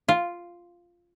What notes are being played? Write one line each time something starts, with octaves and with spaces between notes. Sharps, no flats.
F4